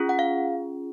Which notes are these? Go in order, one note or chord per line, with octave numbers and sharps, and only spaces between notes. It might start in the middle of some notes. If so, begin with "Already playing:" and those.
Already playing: C#4 F4 G#4
F#5
F5